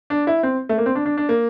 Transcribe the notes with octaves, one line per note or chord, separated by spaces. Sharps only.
D4
E4
C4
A3
A#3
C4
D4
D4
D4
A#3